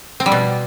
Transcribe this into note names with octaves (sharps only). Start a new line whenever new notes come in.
C4
G3
B2